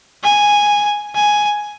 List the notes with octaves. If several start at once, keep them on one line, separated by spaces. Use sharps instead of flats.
G#5
G#5